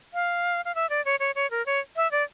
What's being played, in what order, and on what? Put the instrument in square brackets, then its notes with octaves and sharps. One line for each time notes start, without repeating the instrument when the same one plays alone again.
[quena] F5
F5
E5
D5
C#5
C#5
C#5
A#4
C#5
E5
D5